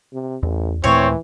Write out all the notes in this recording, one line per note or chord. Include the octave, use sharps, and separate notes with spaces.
C3
A1 E2
D#2 A#2 E3 A3 C4 C#5